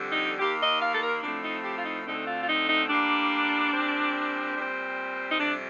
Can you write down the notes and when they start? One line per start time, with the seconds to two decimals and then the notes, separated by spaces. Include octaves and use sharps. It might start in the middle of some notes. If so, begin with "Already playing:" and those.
Already playing: F2 D3 G3
0.11 D#4
0.39 D#2 D#3 A#3 G4
0.60 D#5
0.80 F5
0.94 A4
1.02 A#4
1.22 A2 F3 A3 C4 D4
1.43 D#4
1.64 G4
1.77 F4
1.84 D#4
2.06 D2 D3 A3 C4 D#4
2.26 F4
2.40 F4
2.48 D#4
2.68 D#4
2.89 A2 G3 A#3 D4
3.72 A#2 G3 C4
4.56 A#2 G3 C4
5.31 D#4
5.39 F2 C3 G3 D4